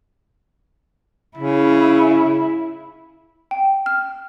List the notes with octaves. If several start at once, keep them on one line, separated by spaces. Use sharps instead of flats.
C#3 E4
G5
F6